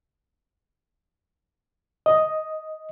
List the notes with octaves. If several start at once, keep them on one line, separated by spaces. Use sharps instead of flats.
D#5